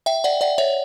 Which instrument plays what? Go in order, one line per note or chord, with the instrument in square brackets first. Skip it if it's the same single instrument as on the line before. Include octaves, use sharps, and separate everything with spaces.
[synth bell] E5 G5
D5 F#5
D5 F#5
C#5 E5